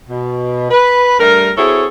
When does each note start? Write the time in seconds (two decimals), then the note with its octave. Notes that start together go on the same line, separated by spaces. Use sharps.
0.09 B2
0.71 B4
1.19 G2 G3 A3 A#4
1.57 C4 E4 F#4 G#4 A4 C#5